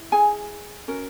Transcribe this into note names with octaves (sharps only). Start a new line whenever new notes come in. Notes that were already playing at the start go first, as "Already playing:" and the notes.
Already playing: E4
G#4 G#5
C#4 F#4 A#4